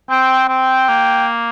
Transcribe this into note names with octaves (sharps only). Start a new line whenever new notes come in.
C4 G5
C4 G5
A#3